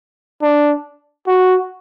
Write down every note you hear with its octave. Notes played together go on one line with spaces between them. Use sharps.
D4
F#4